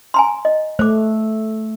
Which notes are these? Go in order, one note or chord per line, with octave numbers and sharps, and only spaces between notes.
G#5 A#5 C6
D#5
A3 C5 D6